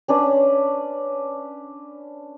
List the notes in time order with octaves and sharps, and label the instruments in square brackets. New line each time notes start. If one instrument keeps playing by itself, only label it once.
[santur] C#4 D4 B4